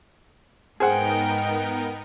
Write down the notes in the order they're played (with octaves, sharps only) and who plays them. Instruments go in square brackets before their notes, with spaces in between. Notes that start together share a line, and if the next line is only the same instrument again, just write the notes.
[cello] G#2 G5 [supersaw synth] B3 D#4 A#4 [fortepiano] G#4 C5 F#5